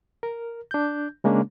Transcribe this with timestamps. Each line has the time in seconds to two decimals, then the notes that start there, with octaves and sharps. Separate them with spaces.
0.23 A#4
0.71 D4 G6
1.24 C#3 G#3 A#3 C#4 D4